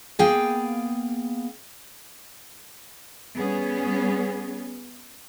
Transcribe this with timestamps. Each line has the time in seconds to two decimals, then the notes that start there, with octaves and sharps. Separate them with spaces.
0.19 A#3 B3 G#4 F5 G5
3.36 G3 B3 C#4 G#4